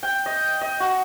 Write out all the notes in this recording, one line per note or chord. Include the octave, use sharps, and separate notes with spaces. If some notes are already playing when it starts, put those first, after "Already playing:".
G5
D#5
D#5
F#4